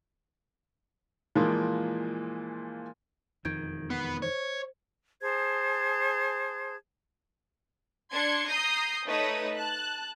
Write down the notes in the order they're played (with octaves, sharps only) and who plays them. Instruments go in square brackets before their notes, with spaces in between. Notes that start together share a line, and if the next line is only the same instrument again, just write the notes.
[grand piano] A#2 E3 F3 G#3 A#3
[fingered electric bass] E1 F2 D#3 [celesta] G6 G#6 D7
[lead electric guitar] B3 [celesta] F#6 B6 C7
[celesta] C5 [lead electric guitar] C#5
[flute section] G#4 C5 A5 G#6
[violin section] D4 C6 G#6 C#7
A#5 D#6 G6 C7
A3 D#4 B4 C#5 D#6
A5 F#6